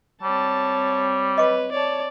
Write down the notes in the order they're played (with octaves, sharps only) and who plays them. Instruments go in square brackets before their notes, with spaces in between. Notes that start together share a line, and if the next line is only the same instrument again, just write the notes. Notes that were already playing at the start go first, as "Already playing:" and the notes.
[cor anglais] G3 [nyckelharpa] C4 C#5 [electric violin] A5
[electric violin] B4 [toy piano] D#5 D6
[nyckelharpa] C#5 A5 [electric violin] D5